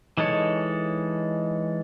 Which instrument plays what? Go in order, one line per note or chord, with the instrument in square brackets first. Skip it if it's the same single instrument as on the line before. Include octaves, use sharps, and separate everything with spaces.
[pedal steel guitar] E3 G#3 D#4 A4 C#5